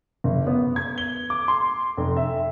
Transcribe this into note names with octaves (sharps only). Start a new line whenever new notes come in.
F#1
B3
G#6
G7
D6
C6
F1
E5